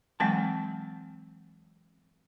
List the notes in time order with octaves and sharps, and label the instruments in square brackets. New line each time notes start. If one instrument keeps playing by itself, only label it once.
[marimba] E3 F#3 G#3 [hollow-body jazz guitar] C4 G5 A5